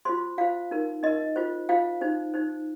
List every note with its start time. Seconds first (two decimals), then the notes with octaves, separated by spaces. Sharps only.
0.05 F4 C5 C6
0.38 F4 C5 F5
0.71 D#4 A#4
1.03 D#4 A#4 D#5
1.36 F4 C5
1.69 F4 C5 F5
2.01 D#4 C5
2.34 D#4 C5